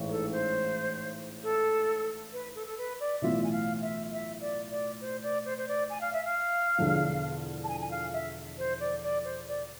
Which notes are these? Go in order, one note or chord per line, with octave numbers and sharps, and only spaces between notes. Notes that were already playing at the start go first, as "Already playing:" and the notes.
Already playing: A1 G#2 E3
A4
C5
A4
B4
A4
A4
B4
D5
B1 A2 E3 B3 F4 E5
G#5
F5
E5
E5
D5
D5
C5
D5
C5
C5
D5
G#5
F5
E5
F5
E1 E2 D3 F3
A5
G#5
G#5
F5
E5
C5
D5
D5
C5
D5